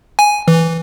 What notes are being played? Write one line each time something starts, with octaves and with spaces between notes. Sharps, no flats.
G#5
E3